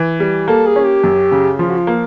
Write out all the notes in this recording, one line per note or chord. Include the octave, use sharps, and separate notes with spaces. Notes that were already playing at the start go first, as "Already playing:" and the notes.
Already playing: E3
G3
A#3 A4
G#4
C#4
G4
F#2
C#3
F3 F4
F#4
F4
A#3